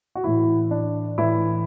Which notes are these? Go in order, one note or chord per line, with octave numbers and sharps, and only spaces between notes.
F#4
A2 E3 E4
D4
A2 E3 E4